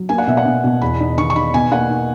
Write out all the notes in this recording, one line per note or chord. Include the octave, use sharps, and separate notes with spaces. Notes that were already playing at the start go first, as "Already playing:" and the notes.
Already playing: F#3
A#3 G#5
F#5
B2 E5
F#5
B2
B2
E2 B5
D#4
D#3 C#6
C#6
D#4 B5
B2 G#5
A#3 F#5
D#4